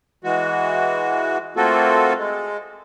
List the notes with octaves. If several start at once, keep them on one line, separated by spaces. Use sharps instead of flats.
E3 G#3 F#4
A3 A#3 C4 F4 F#4 A4
G#3